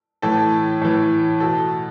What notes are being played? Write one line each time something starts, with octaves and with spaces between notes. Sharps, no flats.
A2 E3 A4
A2 E3
B2 A4